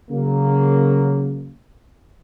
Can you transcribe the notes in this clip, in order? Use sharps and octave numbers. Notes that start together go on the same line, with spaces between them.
C#3 F#3 A#3